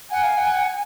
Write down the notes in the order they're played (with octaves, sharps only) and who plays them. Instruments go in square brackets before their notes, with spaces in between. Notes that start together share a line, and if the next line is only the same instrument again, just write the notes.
[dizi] F#5 [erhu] G#5
[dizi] F5
F#5